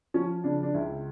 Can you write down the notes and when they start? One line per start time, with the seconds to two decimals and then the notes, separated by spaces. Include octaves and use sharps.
0.14 F3 C#4
0.44 C#3 D4
0.63 D4
0.74 C#2 E4